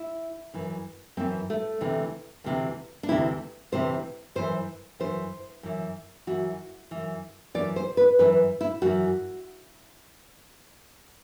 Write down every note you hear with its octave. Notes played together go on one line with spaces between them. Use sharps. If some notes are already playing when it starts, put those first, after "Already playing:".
Already playing: E4
F#2 E3
F#2 E3 C4
A3
D2 C3 E3
D2 C3 E3
D4
D2 C3 E3 E4
D2 C3 E3 C5
F#2 E3 C5
F#2 E3 C5
F#2 E3
F#2 E3 F#4
F#2 E3
F#2 E3 D5
C5
B4
F#2 E3 B4
E4
F#2 E3 F#4